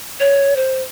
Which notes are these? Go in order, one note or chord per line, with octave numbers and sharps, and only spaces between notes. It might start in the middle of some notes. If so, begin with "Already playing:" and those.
C#5
C5